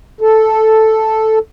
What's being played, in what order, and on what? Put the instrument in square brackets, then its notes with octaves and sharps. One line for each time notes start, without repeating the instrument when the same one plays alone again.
[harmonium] A4